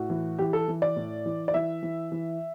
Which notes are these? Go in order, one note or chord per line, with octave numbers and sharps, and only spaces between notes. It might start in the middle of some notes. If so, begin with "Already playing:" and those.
Already playing: A2 F#4
E3
E3 G4
A4
E3
D5
A2
E3
D5
E3 E5
E3
E3